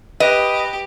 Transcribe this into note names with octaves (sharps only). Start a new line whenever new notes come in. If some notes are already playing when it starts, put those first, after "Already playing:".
G4 B4 D#5